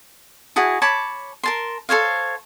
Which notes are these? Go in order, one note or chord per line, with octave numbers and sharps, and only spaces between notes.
E4 F#4 G#4 A5
C#5 A5 B5 D6
A#4 A5 C6
A4 C5 C#5 F5